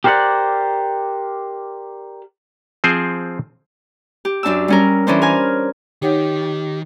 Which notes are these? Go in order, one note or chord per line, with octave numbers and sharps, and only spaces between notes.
G4 A#4 C5 D5 F#5
F3 C4 G#4 C5
G4
F#2 D4 A5 E6
G3 C#4 A#4
E3 C#4 D4 C5
A#4 G#5 F6
D#3 D#4 G4 C#5 F#5